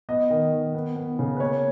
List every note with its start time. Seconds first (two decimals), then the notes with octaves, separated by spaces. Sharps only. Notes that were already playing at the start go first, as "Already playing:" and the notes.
0.09 B3 D#5
0.30 D#3
0.53 D#3
0.75 B3
0.96 B3
1.19 C#3
1.37 B4
1.40 A#3 C#5